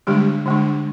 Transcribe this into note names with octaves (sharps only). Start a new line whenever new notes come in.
D3 G3 G#3 D4 G4
D3 G#3 D4